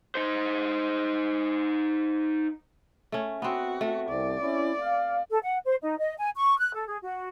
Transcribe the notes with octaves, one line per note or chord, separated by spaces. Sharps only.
D#4 C5
A3 C#4
B3 C4 F#4
A3
C2 D5
C#4 E4
F5
A4
F#5
C5
D#4
D#5
G#5
C#6
F#6
A4
G#4
F#4